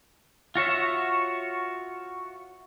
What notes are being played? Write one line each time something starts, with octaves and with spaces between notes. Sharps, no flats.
F4 F#4 C#5 E5